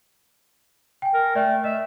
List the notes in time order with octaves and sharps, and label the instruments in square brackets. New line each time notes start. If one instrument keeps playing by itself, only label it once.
[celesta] G5 G#5
[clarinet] A#4
[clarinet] A3 [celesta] D5 G5
[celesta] D#5 [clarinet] E5